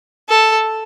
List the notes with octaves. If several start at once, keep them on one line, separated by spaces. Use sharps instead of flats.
A4